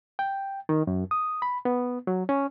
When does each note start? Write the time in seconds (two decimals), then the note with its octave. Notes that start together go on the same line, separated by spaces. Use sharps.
0.19 G5
0.69 D#3
0.87 F#2
1.11 D#6
1.42 B5
1.65 B3
2.07 F#3
2.29 C#4